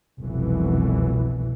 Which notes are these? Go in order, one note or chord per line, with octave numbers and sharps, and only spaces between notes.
F1 C2 B2 E3